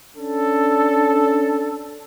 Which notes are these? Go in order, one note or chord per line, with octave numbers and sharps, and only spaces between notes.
C#4 D4 A4